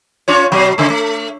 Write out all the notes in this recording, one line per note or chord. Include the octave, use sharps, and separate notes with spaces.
C#4 F4 C#5
B2 F#3
C#3 A3
A3